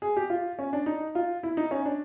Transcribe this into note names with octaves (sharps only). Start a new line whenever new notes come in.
G#4
G4
F4
C#4
D4
D#4
F4
E4
D#4
C#4
D4